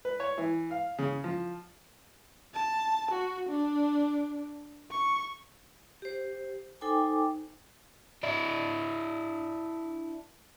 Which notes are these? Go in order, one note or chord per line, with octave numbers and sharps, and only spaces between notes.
B4
C#5
E3
F5
C#3
F3
A5
F#4
D4
C#6
G4 C5
D#4 A4 C5 G5 G#5 D6
D4 E4